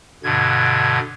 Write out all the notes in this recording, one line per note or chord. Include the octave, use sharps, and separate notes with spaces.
G2 B2 D3 G#6